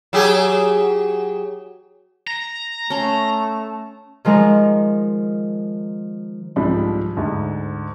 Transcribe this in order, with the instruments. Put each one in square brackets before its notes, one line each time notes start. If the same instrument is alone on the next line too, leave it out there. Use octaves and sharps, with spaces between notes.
[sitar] F#3 G4 G#4
[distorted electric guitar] A#5
[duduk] A3 [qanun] C#4 C6 [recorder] A5
[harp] D#3 F3 G#3 D#4 A#4
[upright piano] C2 G#2 F3 D4 B5
D2 G#2